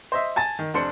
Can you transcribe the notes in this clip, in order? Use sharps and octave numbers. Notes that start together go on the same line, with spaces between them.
C5 D#5 E5
G#5 A5 A6
D#3
F1 D4 C5 C#7